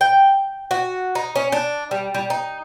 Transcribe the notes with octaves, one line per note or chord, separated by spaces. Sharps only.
G5
F#4
D#4
C#4
D4
G3
G3
D#4